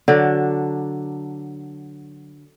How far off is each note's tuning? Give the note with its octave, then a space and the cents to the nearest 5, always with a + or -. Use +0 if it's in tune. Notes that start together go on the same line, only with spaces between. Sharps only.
D3 +0 F#3 +0 D4 +0